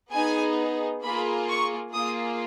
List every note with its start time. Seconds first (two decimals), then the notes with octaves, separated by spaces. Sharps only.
0.11 B3 D#4 G#4 G#5
1.02 A#3 F4 G#4 B5
1.49 C#6
1.94 A#3 F4 G#4 D#6